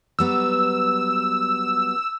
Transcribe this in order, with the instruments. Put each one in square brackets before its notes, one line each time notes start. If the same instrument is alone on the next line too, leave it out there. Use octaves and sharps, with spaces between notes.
[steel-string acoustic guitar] F#3 G3 B3 [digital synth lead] E6